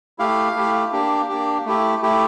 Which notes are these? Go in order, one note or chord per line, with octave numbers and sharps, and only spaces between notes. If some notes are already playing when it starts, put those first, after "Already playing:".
A3 E4 G4 F5
A3 E4 G4
A#3 D4 G4
A#3 D4 G4
A3 E4 G4
A3 E4 G4